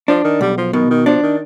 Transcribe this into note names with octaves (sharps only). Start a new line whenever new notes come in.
F3 D4
D#3
B1 G3
F3
B2 D#3
D#3
F3 D4
D#3